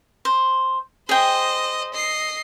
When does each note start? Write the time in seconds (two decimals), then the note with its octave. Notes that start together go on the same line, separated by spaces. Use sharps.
0.25 C5
1.09 G#4 C5 D#5 G5
1.94 D#5 C7